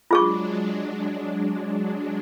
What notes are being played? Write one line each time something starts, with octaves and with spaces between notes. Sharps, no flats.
F#3 G#3 D4 F4 G#4 C#6